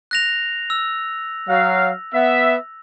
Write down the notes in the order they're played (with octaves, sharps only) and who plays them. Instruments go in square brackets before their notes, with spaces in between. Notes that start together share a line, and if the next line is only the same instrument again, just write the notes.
[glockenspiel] F#6 A#6 F7
E6
[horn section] F#3 F5
B3 E5